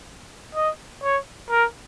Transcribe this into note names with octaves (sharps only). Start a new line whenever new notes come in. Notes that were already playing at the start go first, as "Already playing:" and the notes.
D#5
C#5
A#4